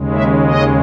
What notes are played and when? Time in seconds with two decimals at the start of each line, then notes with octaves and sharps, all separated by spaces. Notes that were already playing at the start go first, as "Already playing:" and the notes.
Already playing: D#2 C#3 G#3
0.14 E5
0.45 D#5